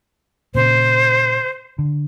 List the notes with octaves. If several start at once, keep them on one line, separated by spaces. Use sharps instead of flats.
A#2 C#3 C5
D3